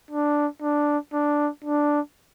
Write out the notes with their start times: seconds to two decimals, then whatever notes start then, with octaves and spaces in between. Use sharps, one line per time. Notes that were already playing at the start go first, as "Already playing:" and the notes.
0.11 D4
0.62 D4
1.13 D4
1.64 D4